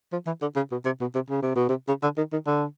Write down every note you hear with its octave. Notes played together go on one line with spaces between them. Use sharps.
F3
E3
D3
C#3
B2
C3
B2
C3
C#3
C3
B2
C3
C#3
D3
D#3
D#3
D3